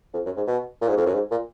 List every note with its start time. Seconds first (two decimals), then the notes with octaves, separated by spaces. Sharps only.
0.14 F2
0.25 F#2
0.36 G#2
0.47 B2
0.81 A#2
0.88 G#2
0.97 F2
1.06 F#2
1.14 G#2
1.31 A#2